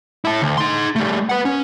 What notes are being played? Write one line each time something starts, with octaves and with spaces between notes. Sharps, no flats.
E4 A5
D2
D#4 C6
G3 A3
B4 F#5
C#4